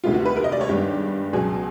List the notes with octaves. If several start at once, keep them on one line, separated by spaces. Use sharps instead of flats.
D2 C3 D#3 G#3 B3 F4
F#4
B4
A#4
D#5
D5
C#5
G2 D#3 G#3 B3 G4
C#2 B2 F#3 G#4